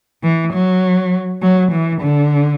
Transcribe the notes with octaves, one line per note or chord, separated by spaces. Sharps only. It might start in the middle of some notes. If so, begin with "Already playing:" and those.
E3
F#3
F#3
E3
D3